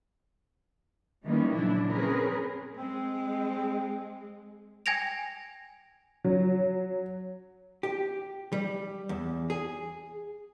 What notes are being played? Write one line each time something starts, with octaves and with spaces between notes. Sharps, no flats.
D#3 E3 G3 G#3 A#3 C#4
A#2 C#3 F3 F#3 D4 E4
C4 C#4 G#4 A#4 B4
G#3 C4
G5 G#5 G#6 A#6 D7 F7
F#3
G4
G3
E2
G#4